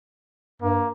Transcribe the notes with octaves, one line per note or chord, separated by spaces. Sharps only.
G2 A#3